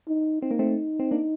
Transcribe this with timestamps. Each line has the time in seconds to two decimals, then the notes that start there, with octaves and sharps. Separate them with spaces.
0.08 D#4
0.42 C4 D#4
0.51 A#3
0.59 A3 C4
1.00 C4
1.11 A#3 D4